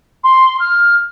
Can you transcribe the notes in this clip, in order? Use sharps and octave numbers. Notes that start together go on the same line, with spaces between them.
C6
F6